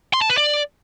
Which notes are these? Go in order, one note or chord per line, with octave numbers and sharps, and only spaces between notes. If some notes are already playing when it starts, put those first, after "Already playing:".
C6
A5
B4
D5